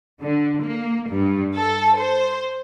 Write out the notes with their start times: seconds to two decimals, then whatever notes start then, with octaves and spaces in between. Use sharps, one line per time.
0.22 D3
0.64 A#3
1.09 G2
1.55 A4
1.98 C5